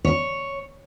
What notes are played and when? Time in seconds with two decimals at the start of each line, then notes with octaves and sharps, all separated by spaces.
0.04 C#5